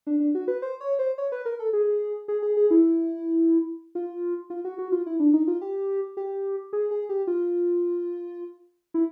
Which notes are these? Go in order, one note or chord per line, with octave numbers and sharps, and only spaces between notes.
D4
D4
F#4
B4
C5
C#5
C5
C#5
B4
A#4
A4
G#4
G#4
G#4
G#4
E4
F4
F4
F#4
F#4
F4
E4
D4
D#4
F4
G4
G4
G#4
G#4
G4
F4
E4